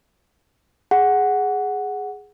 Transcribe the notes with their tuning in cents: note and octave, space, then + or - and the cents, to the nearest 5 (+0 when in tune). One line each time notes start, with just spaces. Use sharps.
G#4 +0 F#5 +0